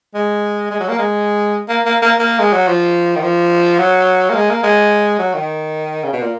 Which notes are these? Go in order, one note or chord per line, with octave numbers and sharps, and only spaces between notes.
G#3
G#3
F#3
A#3
G#3
A#3
A#3
A#3
A#3
G#3
F#3
F3
D#3
F3
F#3
A#3
G#3
A#3
G#3
F#3
D#3
C#3
B2
A#2